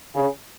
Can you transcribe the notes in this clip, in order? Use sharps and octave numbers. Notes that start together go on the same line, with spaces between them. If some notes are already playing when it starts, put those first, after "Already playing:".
C#3